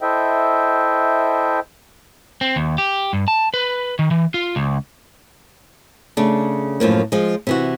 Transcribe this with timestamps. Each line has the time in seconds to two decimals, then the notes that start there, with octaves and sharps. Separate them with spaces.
0.01 E4 A4 C5 D#5 E5 G5
2.41 C4
2.56 D#2
2.78 G4
3.13 G2
3.28 A5
3.54 B4
3.99 D#3
4.11 E3
4.34 F4
4.56 C#2
6.17 C#3 A3 D4
6.80 F#2 A2 F3 A#3
7.12 F3 G#3
7.47 C3 E3 F#4